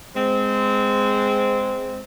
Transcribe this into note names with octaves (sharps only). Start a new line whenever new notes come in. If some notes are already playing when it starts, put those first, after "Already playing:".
G#3 C4